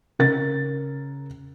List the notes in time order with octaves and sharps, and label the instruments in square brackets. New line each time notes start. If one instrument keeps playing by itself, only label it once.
[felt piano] C#3 A#4 A6